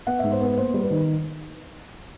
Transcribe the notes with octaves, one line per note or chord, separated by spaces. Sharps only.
B3 F#5
G#2 E5
C5
B3 B4
A#3 C5
G3
B4
D#3